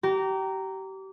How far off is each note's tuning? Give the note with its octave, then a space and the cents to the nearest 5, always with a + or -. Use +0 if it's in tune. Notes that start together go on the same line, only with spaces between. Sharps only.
G4 -30 A#5 -5